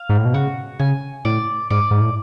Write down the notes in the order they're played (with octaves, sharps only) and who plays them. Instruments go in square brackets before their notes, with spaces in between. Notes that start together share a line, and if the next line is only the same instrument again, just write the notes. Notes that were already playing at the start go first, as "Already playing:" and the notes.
Already playing: [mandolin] F5
[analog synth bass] G#2
A2
B2
[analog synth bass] C#3 [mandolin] F#4
[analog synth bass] C#3 [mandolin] G#5
[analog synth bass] A2 [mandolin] D5
[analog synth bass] G#2 [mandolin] D5
[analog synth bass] G#2
A2